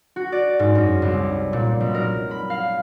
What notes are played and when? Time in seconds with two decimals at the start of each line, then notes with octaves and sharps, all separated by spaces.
0.16 F#4
0.32 D5
0.59 G#2
0.75 F#2
1.02 C2
1.53 A#2
1.80 B1
1.94 A#4
2.31 B5
2.50 F5